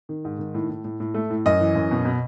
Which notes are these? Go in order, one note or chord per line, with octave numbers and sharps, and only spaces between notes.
D#3
G#2
D#3
A2
A2
A2
A2
A3
A2
F#2 D#5
E3
F#2
B2
B2